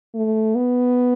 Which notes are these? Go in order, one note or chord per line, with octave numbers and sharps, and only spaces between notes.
A3
B3